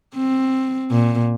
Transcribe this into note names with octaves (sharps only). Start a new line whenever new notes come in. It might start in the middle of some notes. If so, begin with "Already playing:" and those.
C4
A#2